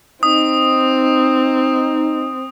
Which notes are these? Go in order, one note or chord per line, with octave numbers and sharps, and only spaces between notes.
C4 D#4 D#6